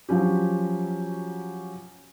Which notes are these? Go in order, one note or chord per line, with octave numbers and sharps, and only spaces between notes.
F3 F#3 C#4 G4